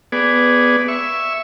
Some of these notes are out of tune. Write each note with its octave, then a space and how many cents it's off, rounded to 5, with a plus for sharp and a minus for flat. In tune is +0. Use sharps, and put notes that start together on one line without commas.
B3 +10 G#4 +0 D5 -10
E5 +0 C#6 +0